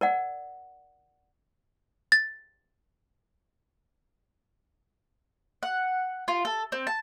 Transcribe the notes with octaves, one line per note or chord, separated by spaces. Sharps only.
A#4 D5 F#5
A6
F#5
F4
A4
C4
A5